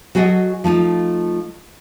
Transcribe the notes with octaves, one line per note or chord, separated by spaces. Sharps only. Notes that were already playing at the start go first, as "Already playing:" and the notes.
F#3 F#4 G#4 A4 D#5
F3 A3 D#4 F4